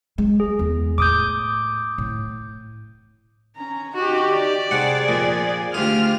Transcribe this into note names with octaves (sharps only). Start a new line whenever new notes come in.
G#3
G#4
E2
A2 D6 D#6 G6
A2
C#4 A#5
D#4 F#4 G4
D5
C3 G#4 F#5
F2 A#2
D2 F4 G4 G#4 F6